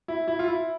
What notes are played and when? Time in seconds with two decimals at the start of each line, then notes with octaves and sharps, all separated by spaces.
0.08 E4
0.28 E4
0.39 F4
0.48 E4